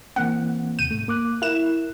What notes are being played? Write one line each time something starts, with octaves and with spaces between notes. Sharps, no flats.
E3 A#3 C4 F#5
D#2 C3 G6 D#7
G#2 A3
A#3 D6 F#6
E4 A#4 F#6 E7